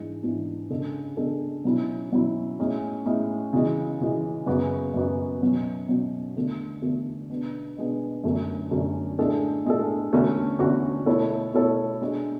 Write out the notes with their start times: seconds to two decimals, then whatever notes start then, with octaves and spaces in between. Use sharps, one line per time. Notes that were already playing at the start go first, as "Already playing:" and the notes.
Already playing: G#2 E3 G#3 D4
0.23 G#2 E3 G#3 D4
0.70 C#3 G#3 D4 A4
1.17 C#3 G#3 D4 A4
1.64 B2 F#3 C#4 E4
2.12 B2 F#3 C#4 E4
2.59 A2 G#3 C#4
3.06 A2 G#3 C#4
3.53 C#3 E3 G#3
4.00 C#3 E3 G#3
4.46 F#2 C#3 G#3 B3 F#4
4.94 F#2 C#3 G#3 B3 F#4
5.41 B2 F#3 C#4
5.89 B2 F#3 C#4
6.36 E2 D3 A3
6.82 E2 D3 A3
7.30 B2 G#3 B3 D4
7.76 B2 G#3 B3 D4
8.24 F#2 D3 A3 C#4
8.71 F#2 D3 A3 C#4
9.18 A2 G#3 D4 A4
9.65 A2 G#3 D4 A4
10.12 E2 D3 A3 C#4 F#4
10.59 E2 D3 A3 C#4 F#4
11.06 B2 A3 E4 A4 C#5
11.54 B2 A3 E4 A4 C#5
12.01 B2 G#3 D4 F#4